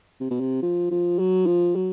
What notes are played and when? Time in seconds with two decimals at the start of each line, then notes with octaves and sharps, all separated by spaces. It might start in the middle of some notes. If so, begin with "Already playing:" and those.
0.20 C3
0.30 B2
0.40 C3
0.62 F3
0.90 F3
1.19 F#3
1.46 F3
1.76 F#3